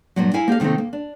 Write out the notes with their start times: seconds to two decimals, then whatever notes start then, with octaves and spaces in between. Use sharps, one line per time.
0.16 G2 A#2 F#3
0.34 E4 A#4 F5 G#5
0.48 A#3 G4 A4 F5
0.60 C3 D#3 A3 A#3 C4
0.78 A#3
0.93 D4